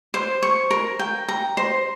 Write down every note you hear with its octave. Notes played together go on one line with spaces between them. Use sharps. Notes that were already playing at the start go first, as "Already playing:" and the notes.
C5
C#6
A#4
G5
A#5
C5